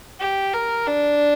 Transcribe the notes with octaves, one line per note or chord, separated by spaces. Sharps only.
G4
A#4
D4